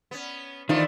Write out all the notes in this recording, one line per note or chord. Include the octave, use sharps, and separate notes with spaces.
B3 C#4
D#3 E3 A3 D4 D#4 F4 C5